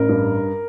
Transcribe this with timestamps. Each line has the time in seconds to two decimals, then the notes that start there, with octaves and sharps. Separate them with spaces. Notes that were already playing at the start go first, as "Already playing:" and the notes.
Already playing: A1 A#4
0.09 G2